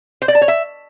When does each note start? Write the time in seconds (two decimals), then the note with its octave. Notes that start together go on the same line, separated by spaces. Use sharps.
0.22 C5
0.28 D5
0.35 A5
0.41 C#5
0.48 E5